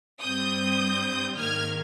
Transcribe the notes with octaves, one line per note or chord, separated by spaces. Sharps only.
G2 G3 C4 D#6 G6
G#2 D#3 A#3 F6 G#6